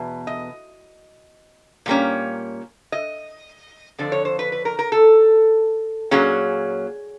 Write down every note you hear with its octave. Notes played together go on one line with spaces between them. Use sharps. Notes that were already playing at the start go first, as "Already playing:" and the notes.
Already playing: E2 B2
D#5
A#2 G3 A#3 C#4
D#5
F2 D3 F3 D5
C#5
C5
B4
B4
A#4
A#4
A4
A#2 F#3 A#3 C#4 G#4